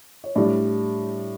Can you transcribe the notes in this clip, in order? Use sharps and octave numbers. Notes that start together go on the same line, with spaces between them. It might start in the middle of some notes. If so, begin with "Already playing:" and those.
C#5
A2 G3 D4 D5